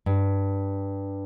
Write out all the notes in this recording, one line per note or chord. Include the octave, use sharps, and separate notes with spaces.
G2